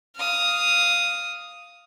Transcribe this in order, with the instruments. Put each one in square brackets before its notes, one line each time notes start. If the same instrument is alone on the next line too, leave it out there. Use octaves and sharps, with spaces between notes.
[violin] F5 D#6